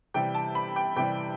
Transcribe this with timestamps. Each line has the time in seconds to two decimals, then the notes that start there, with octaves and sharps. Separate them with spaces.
0.14 C3 E3 G3 G5
0.35 A5
0.55 B5
0.76 G5
0.96 C3 E3 G3 G5